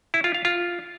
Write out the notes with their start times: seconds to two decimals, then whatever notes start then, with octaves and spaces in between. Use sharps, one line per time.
0.14 E4
0.24 F4
0.34 F5
0.45 F4